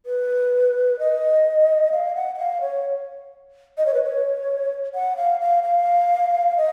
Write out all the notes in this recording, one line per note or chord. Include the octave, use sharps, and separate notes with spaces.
B4
D#5
F5
F#5
F#5
F5
C#5
D#5
C#5
B4
C#5
F#5
F5
F5
F5
D#5